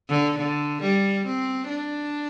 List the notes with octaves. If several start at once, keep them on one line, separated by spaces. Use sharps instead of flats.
D3
D3
G3
C4
D4